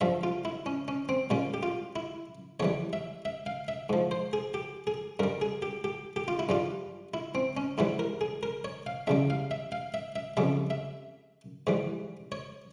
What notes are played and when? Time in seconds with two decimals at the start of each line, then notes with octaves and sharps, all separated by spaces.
0.01 G2 F3 E5
0.23 F4
0.45 E4
0.66 C#4
0.88 C#4
1.09 C4
1.30 A#2 G3 C#4
1.54 G4
1.63 F4
1.96 E4
2.60 E2 E3 G3 C#5
2.93 E5
3.25 E5
3.46 F5
3.68 E5
3.89 G#2 F3
4.11 C5
4.33 G#4
4.54 G4
4.87 G#4
5.19 G2 G3 A#4
5.41 G#4
5.62 G4
5.84 G4
6.16 G4
6.28 F4
6.39 E4
6.49 G2 G3 F4
7.14 E4
7.35 C4
7.57 C#4
7.78 G#2 E3 G3 E4
7.99 A#4
8.21 G#4
8.43 A#4
8.65 C#5
8.86 F5
9.07 E2 C#3 G3 E5
9.30 F5
9.51 E5
9.72 F5
9.94 E5
10.16 E5
10.37 F2 C#3 G3 E5
10.70 E5
11.67 G#2 E3 G3
12.32 C#5